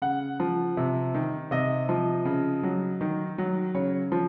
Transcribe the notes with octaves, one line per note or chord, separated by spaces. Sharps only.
C#3 F#5
F3
C3
D#3
C3 D#5
F3
C#3
F#3
D#3
F#3
C#3 C#5
F3